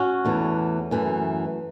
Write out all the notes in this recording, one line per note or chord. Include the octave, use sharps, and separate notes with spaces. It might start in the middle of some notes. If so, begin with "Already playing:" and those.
Already playing: C#4 F#4
E2 E3 A3
F#2 E3 A3